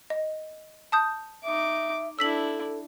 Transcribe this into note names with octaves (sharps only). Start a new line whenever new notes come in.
D#5
A5 D#6 G6
D#4 E5 D6
D4 E4 A4 E6 B6 F#7